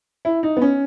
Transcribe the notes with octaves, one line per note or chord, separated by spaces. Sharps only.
E4
D#4
B3
C#4